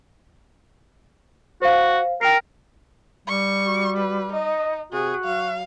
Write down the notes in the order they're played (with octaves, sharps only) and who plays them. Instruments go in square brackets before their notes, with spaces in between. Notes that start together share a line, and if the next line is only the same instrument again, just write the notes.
[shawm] F#4 [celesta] C5 F5
[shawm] A#4 [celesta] G5 F6 C7
[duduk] G3 [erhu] C#6
[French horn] F#4
[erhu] B4
[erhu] D#4 [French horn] D#5
[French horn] C3 [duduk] F#4 [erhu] G#4
[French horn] F#3 [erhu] F5